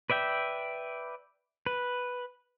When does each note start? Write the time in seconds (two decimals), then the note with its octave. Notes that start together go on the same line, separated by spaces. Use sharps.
0.10 B4 D5 E5 G5
1.66 B4